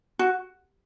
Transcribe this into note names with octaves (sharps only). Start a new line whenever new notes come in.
F#4